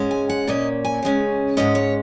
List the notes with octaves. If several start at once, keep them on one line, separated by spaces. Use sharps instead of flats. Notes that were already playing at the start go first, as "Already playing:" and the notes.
Already playing: G#2 G#3 C#4
G#5
F#5
A#2 A#3 C#4 D#5
G#5
C#3 G#3 C#4
G#2 G#3 C#4 D#5
C#5